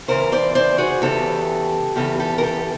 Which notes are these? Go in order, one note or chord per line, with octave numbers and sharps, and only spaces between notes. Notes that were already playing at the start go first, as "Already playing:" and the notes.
E2 C#3 E3 A#4 C5
C5 D5
C5 D5
F#4 G#4
E2 C#3 E3 G4 A4
E2 C#3 E3 G4 A4
G4 A4
A#4
G4 A4